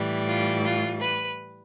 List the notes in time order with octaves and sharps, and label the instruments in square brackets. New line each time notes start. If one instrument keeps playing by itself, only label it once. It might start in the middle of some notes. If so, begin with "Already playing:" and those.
Already playing: [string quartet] A2 E3 G3
F4
F4
B4